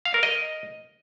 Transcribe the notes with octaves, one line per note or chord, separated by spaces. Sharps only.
F5
A#4
D#5